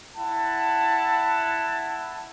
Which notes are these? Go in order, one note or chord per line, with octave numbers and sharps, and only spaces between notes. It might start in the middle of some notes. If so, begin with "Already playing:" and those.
E4 F#5 A5